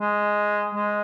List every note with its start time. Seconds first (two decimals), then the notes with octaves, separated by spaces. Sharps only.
0.01 G#3
0.75 G#3